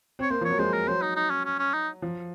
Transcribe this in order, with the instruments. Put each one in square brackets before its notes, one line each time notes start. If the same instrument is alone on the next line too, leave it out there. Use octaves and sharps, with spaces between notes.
[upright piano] C4 [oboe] C#5
[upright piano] A#3 [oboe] C5
[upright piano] F3 [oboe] C#5
[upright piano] F#3
[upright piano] G#3 [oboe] C5
[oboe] A#4
[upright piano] F#3 [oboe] C5
[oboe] D#4
D#4
C#4
C#4
C#4
D#4
[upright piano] F3